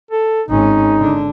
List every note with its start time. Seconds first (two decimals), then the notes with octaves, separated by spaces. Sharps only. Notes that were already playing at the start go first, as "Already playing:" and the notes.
0.11 A4
0.49 G#1 C#4 D#4
0.98 D3 D4